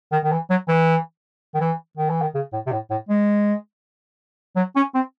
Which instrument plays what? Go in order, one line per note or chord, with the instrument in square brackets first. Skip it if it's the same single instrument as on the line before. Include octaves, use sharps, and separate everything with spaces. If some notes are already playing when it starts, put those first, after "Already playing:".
[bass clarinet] D#3
D#3
E3
F#3
E3
D#3
E3
D#3
E3
D#3
C#3
A2
C3
A2
A2
G#3
F#3
C#4
C4